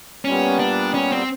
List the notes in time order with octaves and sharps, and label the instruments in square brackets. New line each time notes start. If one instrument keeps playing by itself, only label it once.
[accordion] A#2 G3 B3 [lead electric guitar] C#4
[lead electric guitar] D4
C#4
C4